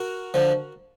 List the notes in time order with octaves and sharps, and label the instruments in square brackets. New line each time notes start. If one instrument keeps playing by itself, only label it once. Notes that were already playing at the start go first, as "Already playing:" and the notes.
Already playing: [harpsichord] F#4 A#4
D3 F3